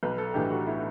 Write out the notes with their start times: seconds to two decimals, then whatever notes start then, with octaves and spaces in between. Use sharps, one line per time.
0.03 B1 B4
0.18 A4
0.34 A2 E3 A3 D4 G4
0.50 F#4
0.67 E4